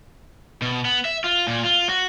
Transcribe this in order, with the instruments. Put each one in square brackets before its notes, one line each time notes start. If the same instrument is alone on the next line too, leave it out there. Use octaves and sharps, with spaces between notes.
[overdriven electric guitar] B2
B3
E5
F4
A#2
F4
F#4